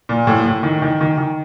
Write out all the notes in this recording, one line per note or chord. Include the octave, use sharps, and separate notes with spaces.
A#2
A2
A2
D#3
D#3
D#3
D#3